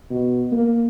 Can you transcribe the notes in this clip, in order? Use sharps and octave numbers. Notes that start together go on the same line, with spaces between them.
B2
A#3